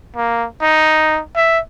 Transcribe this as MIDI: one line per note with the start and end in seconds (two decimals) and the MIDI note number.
0.16 0.46 58
0.62 1.20 63
1.36 1.59 76